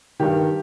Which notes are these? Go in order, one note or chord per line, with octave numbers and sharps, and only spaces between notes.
G2 D#3 G4